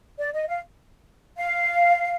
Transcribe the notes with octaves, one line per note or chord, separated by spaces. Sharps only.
D5
D#5
F5
F5